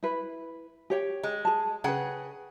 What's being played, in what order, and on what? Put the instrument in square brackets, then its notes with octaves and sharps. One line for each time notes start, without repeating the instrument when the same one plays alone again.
[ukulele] E4 B4
G4 C#5 G5
[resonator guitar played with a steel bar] G#3
[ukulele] G#4 A5
[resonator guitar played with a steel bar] C#3 G#4 F#5 [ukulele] B4 G5